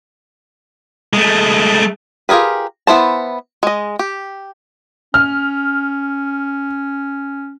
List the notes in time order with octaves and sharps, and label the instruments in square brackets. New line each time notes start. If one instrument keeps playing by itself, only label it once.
[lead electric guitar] G#3 A3
[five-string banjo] F4 G4 G#4 A#4 B4
B3 E4 C5 A5
G#3 D#5
G4
[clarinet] C#4 [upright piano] F6